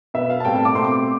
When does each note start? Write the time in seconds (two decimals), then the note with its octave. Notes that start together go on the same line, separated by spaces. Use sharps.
0.14 B2 B3 E5
0.30 F5
0.40 A5
0.45 A2 G3 C4 G5
0.55 A5
0.65 D6
0.75 B2 A3 C4 C6
0.85 D6